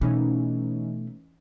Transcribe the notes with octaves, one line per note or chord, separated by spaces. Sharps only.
B2 E3 A3 C#4 D#4